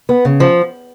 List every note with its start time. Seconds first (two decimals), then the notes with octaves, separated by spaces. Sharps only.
0.09 B3
0.25 C#3
0.40 F3